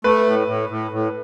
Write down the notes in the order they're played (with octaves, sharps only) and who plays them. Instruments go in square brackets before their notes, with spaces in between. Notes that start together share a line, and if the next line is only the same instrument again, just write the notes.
[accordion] A3 [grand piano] B4
[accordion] A2
A2
A2
A2